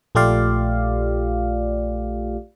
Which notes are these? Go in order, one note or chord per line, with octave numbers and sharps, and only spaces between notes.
A#1 A3 F4 G4 D5 F5